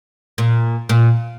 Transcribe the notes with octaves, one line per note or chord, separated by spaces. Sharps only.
A#2
A#2